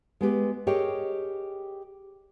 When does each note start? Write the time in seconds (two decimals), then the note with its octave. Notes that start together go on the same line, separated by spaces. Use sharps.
0.21 G#3 B3 G4
0.67 G4 G#4 A#4 C#5 D#5 G5